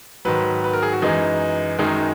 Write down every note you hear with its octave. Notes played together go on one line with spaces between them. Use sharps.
G#2 D#3 F#3 B4
B4
A#4
G#4
F#4
F#2 E3 G#3 D#4
F#2 D#3 G#3 D#4